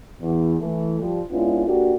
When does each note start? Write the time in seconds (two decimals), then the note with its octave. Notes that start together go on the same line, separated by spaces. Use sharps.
0.21 E2
0.60 E3 A3
1.00 F3 G3
1.30 G#3 B3 C#4 D4 E4 F4
1.66 A#3 D4 F#4 G4 A4